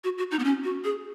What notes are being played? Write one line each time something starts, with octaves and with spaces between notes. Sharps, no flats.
F#4
F#4
D#4
B3
C#4
F#4
G#4